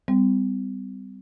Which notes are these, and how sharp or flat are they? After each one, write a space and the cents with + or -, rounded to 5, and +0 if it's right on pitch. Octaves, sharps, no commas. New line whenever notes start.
G3 +0 C4 -40